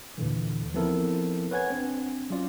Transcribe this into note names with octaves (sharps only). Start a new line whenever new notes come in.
D#2 A#2 D3 E3
F3 B3 C4 E4 A4 A#4
B4 C#5 F#5 G#5 G#6
C4 D4
F#3 C#4 F4 D5